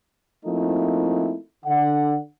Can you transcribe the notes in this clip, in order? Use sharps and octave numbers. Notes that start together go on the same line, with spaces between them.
F3 A3 A#3 C4 D#4 E4
D3 F#5